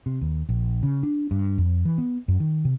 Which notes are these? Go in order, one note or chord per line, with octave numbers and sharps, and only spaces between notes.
C3
D#2
A#1
C#3
D4
G2
F2
E3
B3
F#2
D#3
C3